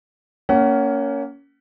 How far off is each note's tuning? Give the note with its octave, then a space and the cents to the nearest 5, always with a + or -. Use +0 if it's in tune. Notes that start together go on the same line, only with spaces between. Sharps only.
A#3 -10 C#4 +15 F#5 +30